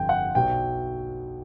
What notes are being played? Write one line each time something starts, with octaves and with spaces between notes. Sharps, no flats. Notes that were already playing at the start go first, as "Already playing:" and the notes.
Already playing: G1 F2 C3 G5
F#5
B1 B2 F#3 G5